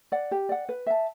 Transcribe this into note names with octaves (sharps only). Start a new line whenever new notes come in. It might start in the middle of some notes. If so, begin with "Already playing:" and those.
D5 F#5
G4
D5 F#5
B4
E5 A5